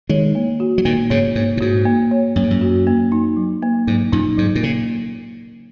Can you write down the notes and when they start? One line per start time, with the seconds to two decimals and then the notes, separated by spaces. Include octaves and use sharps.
0.09 D#3 G#3 C#5
0.35 A#3
0.60 F#4
0.78 F#3
0.85 A#2 D#3 A#3
1.10 G#2 C#3 C#5
1.35 G#2 A#3
1.57 A#2
1.61 G#2 F#4
1.85 A#3
2.11 C#5
2.36 F#2 A#3
2.43 G#2
2.50 F#2
2.61 F#4
2.87 A#3
3.12 D#4
3.37 F#3
3.62 A#3
3.87 G#2 F#3
4.12 F#2 A#2 D#4
4.37 G#2 F#3
4.55 A#2
4.63 C#3 A#3